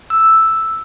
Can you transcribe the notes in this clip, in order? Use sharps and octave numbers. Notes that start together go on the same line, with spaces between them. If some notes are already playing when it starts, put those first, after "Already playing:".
E6